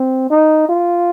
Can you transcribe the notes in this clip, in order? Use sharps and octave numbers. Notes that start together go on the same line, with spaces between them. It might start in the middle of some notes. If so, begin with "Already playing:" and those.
Already playing: C4
D#4
F4